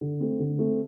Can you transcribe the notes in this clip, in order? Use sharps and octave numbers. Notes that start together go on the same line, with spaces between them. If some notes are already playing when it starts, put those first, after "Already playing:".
D3
A3 C4
D3
A3 C4